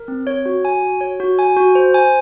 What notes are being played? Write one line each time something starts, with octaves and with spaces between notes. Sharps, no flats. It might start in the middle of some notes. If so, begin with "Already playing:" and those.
Already playing: A#4
C4
C#5
F#4
G#5
F#4
C#5
F#4
G#5
F#4
C5
G#5